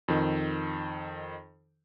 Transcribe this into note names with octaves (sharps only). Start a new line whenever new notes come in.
F2 D#3